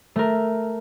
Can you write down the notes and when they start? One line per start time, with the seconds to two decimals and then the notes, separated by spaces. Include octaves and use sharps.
0.16 A3 A#4